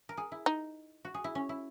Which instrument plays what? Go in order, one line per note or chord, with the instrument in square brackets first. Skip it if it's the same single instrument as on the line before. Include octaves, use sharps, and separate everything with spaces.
[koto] A#4
G#4
E4
[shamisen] D#4
[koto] F#4
G#4
E4
C#4
E4